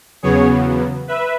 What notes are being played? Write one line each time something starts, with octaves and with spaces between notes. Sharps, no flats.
E2 C#3 F#3 B3 G#4 C#5
B4 E5